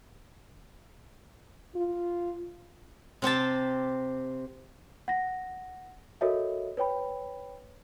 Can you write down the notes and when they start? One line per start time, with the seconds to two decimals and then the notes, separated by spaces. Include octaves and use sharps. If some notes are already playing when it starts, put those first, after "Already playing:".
1.75 F4
3.22 C3 C4 G4 A5
5.08 F#5 A#6
6.21 F#4 A4 A#4 C#5 D#5 E5
6.77 B4 C#5 G5 B5